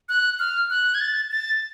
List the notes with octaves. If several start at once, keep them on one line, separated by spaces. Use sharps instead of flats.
F#6
F6
F#6
G#6
A6
A6